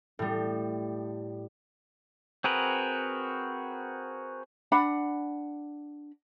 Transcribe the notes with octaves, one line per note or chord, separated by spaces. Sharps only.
A2 G3
C4 F#4 G#4 A#4 B4
D4 F#5 B5